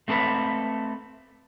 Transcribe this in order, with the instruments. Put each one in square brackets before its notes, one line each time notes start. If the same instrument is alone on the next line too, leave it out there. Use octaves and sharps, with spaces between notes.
[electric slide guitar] A3 C4 A4 B4